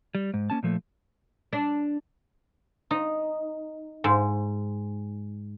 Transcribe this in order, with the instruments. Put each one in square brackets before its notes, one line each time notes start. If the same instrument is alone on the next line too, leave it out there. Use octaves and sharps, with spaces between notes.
[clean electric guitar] G3
G#2
A#3 C#4 A5
A#2 F3 A3
[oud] D4
[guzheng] D#4
G#2